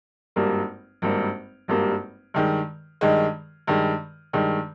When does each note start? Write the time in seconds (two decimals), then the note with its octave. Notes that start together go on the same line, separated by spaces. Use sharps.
0.36 G#1 G2 G3 A#3
1.02 G#1 G2 G3 A#3
1.68 G#1 G2 G3 A#3
2.34 G2 D#3 G#3
3.01 G2 D#3 G#3
3.67 G2 D#3 G#3
4.33 G2 D#3 G#3